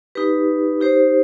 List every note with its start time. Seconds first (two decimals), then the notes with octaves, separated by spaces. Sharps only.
0.15 D#4 G4 B4
0.81 D#4 G4 C5